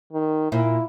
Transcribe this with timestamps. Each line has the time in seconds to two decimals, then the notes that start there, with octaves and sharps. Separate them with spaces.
0.13 D#3
0.52 A#2 E4